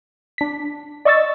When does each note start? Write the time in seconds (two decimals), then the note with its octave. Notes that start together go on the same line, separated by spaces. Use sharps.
0.38 D4 B6
1.05 D5 D#5 C#6 E6 A6